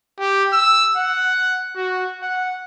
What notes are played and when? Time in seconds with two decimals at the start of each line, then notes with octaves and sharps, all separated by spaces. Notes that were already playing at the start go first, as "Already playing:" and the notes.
0.19 G4
0.53 E6
0.97 F#5
1.76 F#4
2.23 F#5